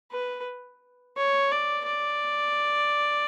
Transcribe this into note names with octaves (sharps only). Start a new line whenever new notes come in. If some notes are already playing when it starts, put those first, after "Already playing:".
B4
C#5
D5
D5